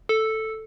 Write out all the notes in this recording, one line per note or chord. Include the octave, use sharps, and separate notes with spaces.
A4